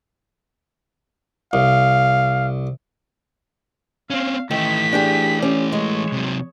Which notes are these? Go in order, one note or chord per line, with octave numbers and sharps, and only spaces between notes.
C2 F5
C4 C#4 F5
D#3 E3 A3 B6
D4 G4 G#4
C#4 G4
G#3 C#5
C3 F#3